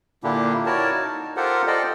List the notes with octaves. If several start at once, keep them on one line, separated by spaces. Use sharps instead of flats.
A#2 D3 A#3 D4 E4 G4
E4 F#4 A#4 C#5 D5 A5
D#4
F4 G4 A4 A#4 C5 F#5
A4 C5 D5 D#5 G5